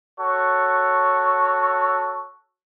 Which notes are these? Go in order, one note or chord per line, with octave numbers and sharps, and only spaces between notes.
F#4 A4 C#5